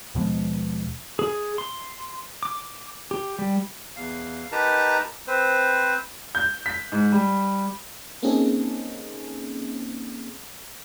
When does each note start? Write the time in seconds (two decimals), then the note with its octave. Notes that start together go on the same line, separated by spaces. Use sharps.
0.15 D#2 B2 F3 G#3
1.19 G#4
1.58 C6
2.43 D6
3.11 G4
3.39 G3
3.96 E2 F5
4.52 D#4 G4 A#4 B4 A5 A#5
5.27 C4 B4 C5
6.35 G6
6.66 B6
6.92 G#2
7.12 G3
8.23 A#3 C4 C#4 D#4 G#4 A4